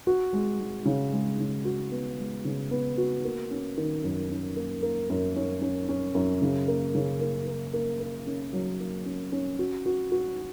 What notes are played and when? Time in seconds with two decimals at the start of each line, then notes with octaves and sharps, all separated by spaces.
0.07 F#4
0.33 G#3
0.60 G#3
0.86 C#3
1.12 G#3
1.38 C#3
1.65 F#4
1.92 B3
2.19 G#3
2.45 C#3
2.71 B3
2.98 F#4
3.24 A#3
3.51 C#4
3.77 D#3
4.04 F#2
4.30 C#4
4.56 A#3
4.82 A#3
5.10 F#2
5.36 C#4
5.62 C#4
5.89 C#4
6.15 F#2
6.42 C#3
6.68 A#3
6.95 C#3
7.21 A#3
7.47 A#3
7.74 A#3
8.00 A#3
8.27 C#4
8.53 F#3
8.80 A#3
9.06 C#4
9.32 C#4
9.59 F#4
9.86 F#4
10.12 F#4